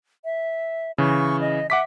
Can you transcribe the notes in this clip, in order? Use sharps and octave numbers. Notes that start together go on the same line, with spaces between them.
E5
C#3 E3 C#6
D#5
E5 F#5 D6 B6